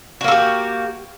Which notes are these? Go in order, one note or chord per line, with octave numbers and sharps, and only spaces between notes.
A#3 F#4 G4 A4